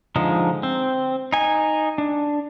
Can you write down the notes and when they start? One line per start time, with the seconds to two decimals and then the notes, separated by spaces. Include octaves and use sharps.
0.16 D3 F3 G#3 D#4
0.63 C4
1.33 D#4 G#5
1.98 D4